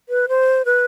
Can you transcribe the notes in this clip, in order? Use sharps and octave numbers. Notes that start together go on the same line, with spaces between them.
B4
C5
B4